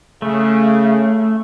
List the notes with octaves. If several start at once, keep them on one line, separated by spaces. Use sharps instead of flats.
C#3 A3